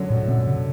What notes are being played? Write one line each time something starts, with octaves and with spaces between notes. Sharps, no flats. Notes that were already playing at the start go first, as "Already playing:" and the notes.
Already playing: F#2 D3 F#3
A2
F#2 A#2
C3